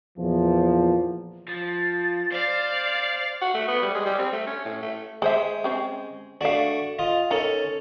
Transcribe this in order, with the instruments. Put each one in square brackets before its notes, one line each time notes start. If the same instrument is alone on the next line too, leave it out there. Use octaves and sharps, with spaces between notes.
[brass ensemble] E2 A#2 F3
[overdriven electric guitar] F3 [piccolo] A6
[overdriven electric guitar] C5 [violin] D5 F5
[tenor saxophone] F#4
A3
B3
G3
G#3
G3
C4
A3
C#4
A2
A3
[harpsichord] G#3 [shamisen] G#4 C5 E5
[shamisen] C4 C#4 G4
[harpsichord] A3 D4 F#4 [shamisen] D5 F5
[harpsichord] F4 D#5
[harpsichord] C#4 A4 [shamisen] D#4 A#4